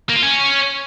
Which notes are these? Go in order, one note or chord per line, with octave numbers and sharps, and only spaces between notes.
A#3
F4
C#4